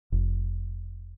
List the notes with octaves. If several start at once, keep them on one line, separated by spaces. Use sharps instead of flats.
F1